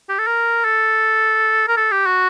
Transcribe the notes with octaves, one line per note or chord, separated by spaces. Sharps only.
G4
A4
A#4
A4
A#4
A4
G4
F#4